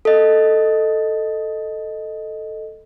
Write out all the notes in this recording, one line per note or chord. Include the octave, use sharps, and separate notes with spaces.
A4 D#5